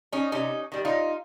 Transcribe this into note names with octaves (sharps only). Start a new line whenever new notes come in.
C#4 D#4
C3 C#4 D#4
D#3 G3
D#4 F4